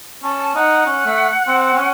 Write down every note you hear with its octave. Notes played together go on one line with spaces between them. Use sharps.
C#4 A5
D#4 F#5
C#4
A3
C4
C4
C#4